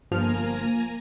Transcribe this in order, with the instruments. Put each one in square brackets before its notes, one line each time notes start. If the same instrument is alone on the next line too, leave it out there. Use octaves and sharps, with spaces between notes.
[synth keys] G1 F3 F6 [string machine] A#3 G#5 A#5